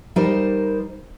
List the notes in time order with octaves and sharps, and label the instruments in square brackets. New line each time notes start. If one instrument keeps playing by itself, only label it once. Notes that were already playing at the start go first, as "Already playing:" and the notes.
[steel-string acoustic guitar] G3 D#4 A#4 C5 D#5